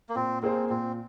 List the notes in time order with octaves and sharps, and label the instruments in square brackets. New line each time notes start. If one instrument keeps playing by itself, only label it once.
[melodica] A#3
[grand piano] A#2 [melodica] C4
[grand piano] A#3 G#4 C5 [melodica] C4
[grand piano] A#2 [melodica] C4